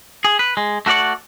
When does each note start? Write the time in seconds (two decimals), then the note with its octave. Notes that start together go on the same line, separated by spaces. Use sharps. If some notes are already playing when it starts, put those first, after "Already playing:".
0.25 G#4
0.39 B4
0.57 G#3
0.86 A3 F#4 A#4 D5 F#5